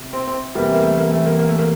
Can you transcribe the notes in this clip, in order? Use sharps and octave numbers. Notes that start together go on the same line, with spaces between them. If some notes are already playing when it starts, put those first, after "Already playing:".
Already playing: C3
C4
C4
E2 C3 E3 G3 A#3
A#3
A3
A#3
A3
A#3
A#3
A3
A#3